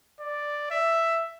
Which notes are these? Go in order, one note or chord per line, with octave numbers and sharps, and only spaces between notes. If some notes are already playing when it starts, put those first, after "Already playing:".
D5
E5